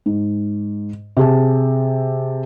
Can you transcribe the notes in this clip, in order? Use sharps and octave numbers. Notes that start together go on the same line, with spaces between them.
G#2
C3 G#4 A5